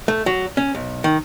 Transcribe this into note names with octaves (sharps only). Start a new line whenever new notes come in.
A3
F#3
C#4
B1
D#3